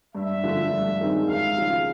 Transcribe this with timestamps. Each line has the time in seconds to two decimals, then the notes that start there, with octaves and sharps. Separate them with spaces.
0.15 G2 E5
0.43 D3 F3 A3
0.71 G2
1.00 D#3 G#3 C4 D#4
1.28 C#2 F5
1.57 C#3 F3 G#3